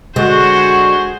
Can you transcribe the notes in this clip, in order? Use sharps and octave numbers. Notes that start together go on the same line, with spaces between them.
D3 G#3 F#4 G#4 C5